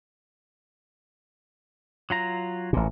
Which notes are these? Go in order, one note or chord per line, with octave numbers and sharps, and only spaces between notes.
F#3 F4 A#5
A1 A#2